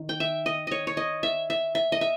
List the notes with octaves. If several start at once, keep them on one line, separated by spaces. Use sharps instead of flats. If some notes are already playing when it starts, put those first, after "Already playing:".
Already playing: D#3
G5
E5
D#5
C#5 D#5
C#5
D#5
E5
E5
E5
D#5
E5